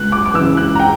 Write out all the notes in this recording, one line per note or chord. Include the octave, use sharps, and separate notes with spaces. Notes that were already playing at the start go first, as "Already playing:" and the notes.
Already playing: C#2 F#6
D6
D6
C#3 E3 E6
F#6
A#5
G5